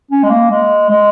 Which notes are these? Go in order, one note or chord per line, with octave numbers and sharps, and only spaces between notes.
C#4
G#3
A#3
G#3
G#3